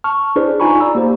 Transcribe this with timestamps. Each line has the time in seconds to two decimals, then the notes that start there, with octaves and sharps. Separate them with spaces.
0.04 A5 C#6 F6
0.36 D4 E4 G#4 B4 C5 D5
0.60 D#4 F4 G#5 A#5 B5 C#6
0.80 D5 A#5 E6
0.95 A#3 G4 C5